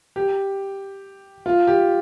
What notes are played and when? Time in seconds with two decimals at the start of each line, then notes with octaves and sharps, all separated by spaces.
0.16 G4
1.46 F4
1.67 G4